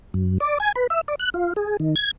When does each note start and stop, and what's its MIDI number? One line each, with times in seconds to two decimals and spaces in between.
0.14 0.38 42
0.40 0.58 74
0.60 0.72 80
0.76 0.87 71
0.90 1.01 76
1.08 1.15 74
1.19 1.30 90
1.34 1.53 65
1.56 1.77 68
1.80 1.95 51
1.96 2.11 92